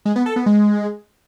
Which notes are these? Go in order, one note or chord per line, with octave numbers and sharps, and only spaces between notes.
G#3
B3
A4
B3
G#3